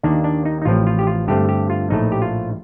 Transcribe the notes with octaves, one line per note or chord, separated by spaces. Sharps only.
D#2 D#3 A#3 D4
D4
D#4
D#4
A1 A2 F3 C4 F4
F4
G4
F4
G2 D3 A3 C4 G4
G4
F4
A#1 A2 A3 D#4
G4
F4